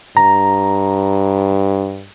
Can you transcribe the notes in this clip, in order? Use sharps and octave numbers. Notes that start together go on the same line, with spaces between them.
G2 A#5